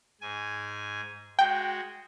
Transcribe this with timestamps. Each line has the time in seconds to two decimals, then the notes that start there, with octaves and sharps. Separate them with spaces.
0.21 G#2 G#5
1.39 G#3 F#4 G5